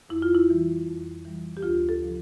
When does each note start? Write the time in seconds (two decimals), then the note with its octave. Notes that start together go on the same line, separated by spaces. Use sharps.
0.09 F2 E4
0.22 F4
0.35 E4
0.49 E3 G3
0.86 F2
1.25 E3 G3
1.57 G4
1.62 D2 F4
1.89 A4
2.01 C#3 F3